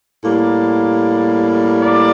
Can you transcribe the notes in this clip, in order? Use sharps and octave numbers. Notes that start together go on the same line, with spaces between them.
A2 G3 A#3
D5